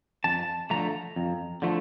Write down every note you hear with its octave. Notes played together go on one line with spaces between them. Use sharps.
F2 A5
D3 F3 A3 A#5
F2
D3 F3 A3